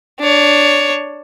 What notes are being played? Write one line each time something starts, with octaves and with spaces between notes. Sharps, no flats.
D4 C#5